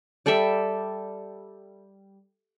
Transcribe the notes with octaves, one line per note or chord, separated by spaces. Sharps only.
G3 A4 D5 E5